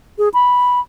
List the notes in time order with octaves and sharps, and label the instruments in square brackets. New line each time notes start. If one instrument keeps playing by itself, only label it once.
[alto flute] G#4
B5